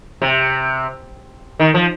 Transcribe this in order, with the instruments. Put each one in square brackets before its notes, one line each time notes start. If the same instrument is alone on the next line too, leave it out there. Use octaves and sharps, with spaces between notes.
[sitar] C3
D#3
F3